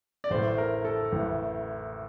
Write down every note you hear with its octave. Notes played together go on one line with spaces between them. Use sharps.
D5
A1 A2 C5
A#4
A4
A1 A2